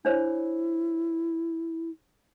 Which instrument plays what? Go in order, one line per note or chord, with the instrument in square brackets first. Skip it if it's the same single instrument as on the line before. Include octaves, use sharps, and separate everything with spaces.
[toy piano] D4 C5 C#5 [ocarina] E4